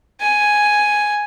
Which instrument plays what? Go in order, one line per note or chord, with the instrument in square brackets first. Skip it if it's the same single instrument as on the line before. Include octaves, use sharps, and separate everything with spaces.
[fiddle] G#5